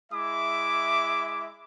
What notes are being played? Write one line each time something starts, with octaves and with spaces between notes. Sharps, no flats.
G#3 E4 E5 D6